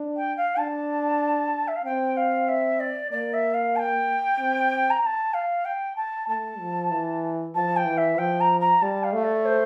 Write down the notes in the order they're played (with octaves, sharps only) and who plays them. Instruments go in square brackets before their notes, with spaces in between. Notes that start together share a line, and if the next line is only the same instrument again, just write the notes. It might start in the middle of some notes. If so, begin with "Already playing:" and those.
Already playing: [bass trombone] D4
[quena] G5
F5
[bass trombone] D4 [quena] A5
[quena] E5
F5
[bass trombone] C4 [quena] G5
[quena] F5
E5
D5
[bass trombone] A#3 [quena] D5
[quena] E5
F5
A5
G5
[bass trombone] C4
[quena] A#5
A#5
A5
F5
G5
A5
[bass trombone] A3 [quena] A5
[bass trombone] F3
E3
[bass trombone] F3 [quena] A5
[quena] G5
[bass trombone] E3
[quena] E5
[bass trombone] F3 [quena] G5
[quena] A#5
A#5
[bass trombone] G3 [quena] A5
[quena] F5
[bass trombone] A3
[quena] D5
C5